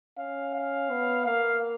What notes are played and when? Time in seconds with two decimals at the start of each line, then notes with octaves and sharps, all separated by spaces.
0.18 C#4 F5
0.55 F5
0.91 B3
1.26 A#3 F5